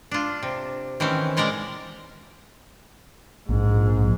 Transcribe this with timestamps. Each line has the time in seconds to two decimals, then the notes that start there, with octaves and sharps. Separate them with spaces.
0.11 D4 F4
0.43 C3
1.00 D#3 E3 C4 C#4
1.37 A#2 G#3 A#4 D5 A#5
3.49 A#1 G#2